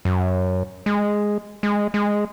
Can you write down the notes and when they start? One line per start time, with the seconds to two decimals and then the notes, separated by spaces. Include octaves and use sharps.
0.05 F#2
0.86 G#3
1.63 G#3
1.94 G#3